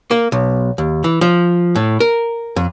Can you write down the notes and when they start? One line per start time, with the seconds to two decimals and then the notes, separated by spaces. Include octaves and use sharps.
0.11 A#3
0.32 B1
0.78 D#2
1.04 E3
1.21 F3
1.76 A2
2.00 A#4
2.56 F2